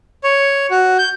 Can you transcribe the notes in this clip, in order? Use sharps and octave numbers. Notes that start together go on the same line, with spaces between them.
C#5
F#4
G6